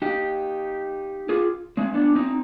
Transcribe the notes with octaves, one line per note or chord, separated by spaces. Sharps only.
D#4 G4
F4 G#4
G#3 C4
B3 D4
C4 D#4